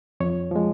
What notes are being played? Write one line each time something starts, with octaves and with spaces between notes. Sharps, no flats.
F2 C#5
F3 G#3